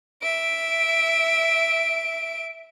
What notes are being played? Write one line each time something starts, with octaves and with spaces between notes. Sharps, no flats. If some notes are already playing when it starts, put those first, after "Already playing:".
E5 D7